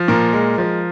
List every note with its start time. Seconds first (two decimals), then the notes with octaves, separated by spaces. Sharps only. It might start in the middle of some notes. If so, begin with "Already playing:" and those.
Already playing: F3
0.08 A#2 A#4
0.33 G#3
0.58 F3